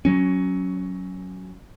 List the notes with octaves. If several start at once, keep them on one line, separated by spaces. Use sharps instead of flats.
F#3 C#4